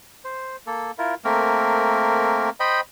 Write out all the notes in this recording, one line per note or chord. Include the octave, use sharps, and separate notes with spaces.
C5
A#3 A4
E4 F4 A#4
A3 A#3 C4 A#4
C5 D#5 G5 B5